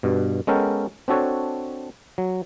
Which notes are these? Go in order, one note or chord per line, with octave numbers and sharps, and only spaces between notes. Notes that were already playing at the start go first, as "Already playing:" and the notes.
G2 B2
G#3 B3 C#4 A4 A#4 G5
C4 D4 F#4 A4 C#5
F#3